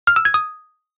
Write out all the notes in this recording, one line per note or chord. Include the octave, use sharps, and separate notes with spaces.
F6
E6
G#6
D#6